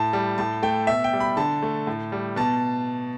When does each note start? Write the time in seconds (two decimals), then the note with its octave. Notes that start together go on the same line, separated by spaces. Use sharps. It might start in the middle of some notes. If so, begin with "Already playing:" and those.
Already playing: A2 A5
0.13 G3
0.38 A2 A5
0.62 A3 G5
0.87 B2 E5
1.04 G5
1.13 G3
1.20 B5
1.37 D3 A5
1.62 A3
1.87 A2
2.12 G3
2.36 B2 A5